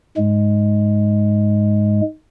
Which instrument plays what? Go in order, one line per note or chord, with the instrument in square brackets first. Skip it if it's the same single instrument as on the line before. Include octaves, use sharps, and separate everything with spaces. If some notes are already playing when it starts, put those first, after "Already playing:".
[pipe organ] G#2 G#3